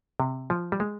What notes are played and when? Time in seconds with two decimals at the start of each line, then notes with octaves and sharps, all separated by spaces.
0.20 C3
0.50 F3
0.72 G3
0.80 G#3